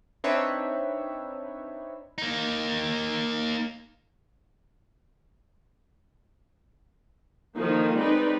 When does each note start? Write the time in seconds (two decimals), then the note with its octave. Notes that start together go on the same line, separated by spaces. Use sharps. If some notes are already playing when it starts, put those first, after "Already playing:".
0.24 C4 D4 D#4 B4 C#5 E5
2.18 A#3 D#4
7.56 D3 D#3 F3 A#3 D#4 F4
7.96 G#3 C4 D#4 B4 D5